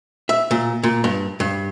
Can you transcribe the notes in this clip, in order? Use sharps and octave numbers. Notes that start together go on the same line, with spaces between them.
E5
A#2
A#2
G2
G2